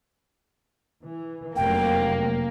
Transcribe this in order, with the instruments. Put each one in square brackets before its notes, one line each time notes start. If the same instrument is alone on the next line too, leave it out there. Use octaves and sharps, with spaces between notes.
[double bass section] E3
[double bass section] F1 F#2 [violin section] A#3 [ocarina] G5